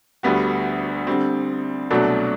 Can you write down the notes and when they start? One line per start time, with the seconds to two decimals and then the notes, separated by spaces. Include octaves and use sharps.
0.23 D2 D3 G3 B3 F#4
1.07 D3 G3 C4
1.91 C2 B2 F#3 A3 D4